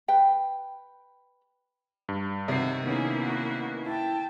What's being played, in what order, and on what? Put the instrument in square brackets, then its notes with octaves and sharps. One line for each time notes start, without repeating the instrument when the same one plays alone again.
[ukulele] B4 G5
[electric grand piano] G2
[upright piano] C3 C7 [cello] D#3 F#4
[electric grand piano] D#3 B3 C#4 [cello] A#3 E4 [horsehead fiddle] D#4 G#4
[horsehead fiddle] F#4
[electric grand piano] E4 [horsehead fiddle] G5 A5